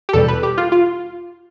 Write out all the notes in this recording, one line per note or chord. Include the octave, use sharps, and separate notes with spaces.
G4
E2 B2 G3 A4
B4
G4
F4
F4